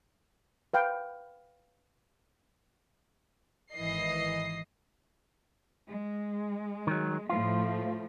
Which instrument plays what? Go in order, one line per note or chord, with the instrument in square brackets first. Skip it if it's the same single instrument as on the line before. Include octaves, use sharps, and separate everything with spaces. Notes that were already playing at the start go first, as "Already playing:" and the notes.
[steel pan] B4 F5 G5
[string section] G#1 E3 D#5 C7
[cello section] G#3
[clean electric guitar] D#3 F#3
[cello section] A2 F3 A3 [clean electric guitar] F4